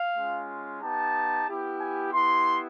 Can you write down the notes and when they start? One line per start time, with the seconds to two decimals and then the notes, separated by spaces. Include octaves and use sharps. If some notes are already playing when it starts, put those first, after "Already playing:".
Already playing: F5
0.16 G#3 C#4 F4
0.81 B3 D#4 G4 A5
1.48 B3 E4 G4
1.80 G#5
2.12 B3 E4 G4 C6